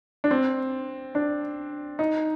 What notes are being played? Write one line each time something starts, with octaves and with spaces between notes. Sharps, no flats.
D4
C4
D4
D#4